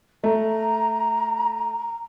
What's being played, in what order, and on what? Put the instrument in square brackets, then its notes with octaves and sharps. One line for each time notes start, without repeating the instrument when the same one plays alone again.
[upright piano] A3 [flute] A#5